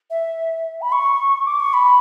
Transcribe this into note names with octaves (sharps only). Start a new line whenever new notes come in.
E5
B5
C#6
D6
C#6
B5